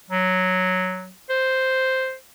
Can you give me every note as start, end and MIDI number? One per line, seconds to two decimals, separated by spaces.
0.10 1.11 54
1.30 2.15 72